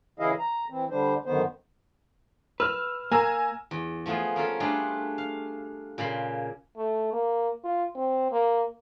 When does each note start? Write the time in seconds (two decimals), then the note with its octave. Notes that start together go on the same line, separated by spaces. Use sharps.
0.19 C#3 E3 E4 G#4 D#5 F5
0.39 A#5
0.70 E3 C4
0.90 D3 G3 D4 C5
1.25 F#2 D3 D#3 B3 C5
2.60 B4 E6 F6
3.12 A#3 G#5 A#5 E6
3.71 E2
4.06 F3 A3 B3 F4 G#4
4.36 A#3 C#4 F4 A4
4.60 G3 A3 D4 F4 G#4 B4
5.18 F5
5.98 A#2 C#3 B5 C6
6.77 A3
7.13 A#3
7.64 F4
7.95 C4
8.32 A#3